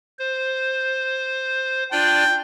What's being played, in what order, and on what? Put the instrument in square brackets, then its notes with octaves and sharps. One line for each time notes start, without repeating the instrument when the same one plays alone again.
[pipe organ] C5
[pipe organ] D4 F4 D5 [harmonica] G5